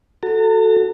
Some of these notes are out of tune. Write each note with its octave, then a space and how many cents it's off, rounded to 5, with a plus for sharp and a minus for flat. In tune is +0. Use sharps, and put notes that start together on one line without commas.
F#4 +0 A4 +0 A#5 -45